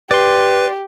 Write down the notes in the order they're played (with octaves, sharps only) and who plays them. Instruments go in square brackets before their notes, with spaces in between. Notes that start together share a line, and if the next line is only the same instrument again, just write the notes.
[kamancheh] G4 [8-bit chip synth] B4 [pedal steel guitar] D5 C6